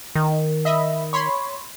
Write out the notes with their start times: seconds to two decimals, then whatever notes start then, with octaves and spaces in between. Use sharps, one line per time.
0.15 D#3
0.65 D#5 E5 B5
1.13 C#5 B5 C6